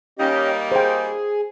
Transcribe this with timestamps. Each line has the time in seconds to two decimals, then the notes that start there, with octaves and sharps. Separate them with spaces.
0.19 G3 A#3 C#4 D#4 G4 D#5
0.72 G#4 C5 G5